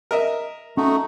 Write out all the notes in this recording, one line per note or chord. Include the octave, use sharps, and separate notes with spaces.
A#4 D#5 E5
A3 C#4 D#4 F#4